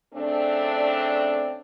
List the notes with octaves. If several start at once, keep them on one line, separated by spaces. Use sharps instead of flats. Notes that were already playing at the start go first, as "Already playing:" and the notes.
C#3 A3 C4 D4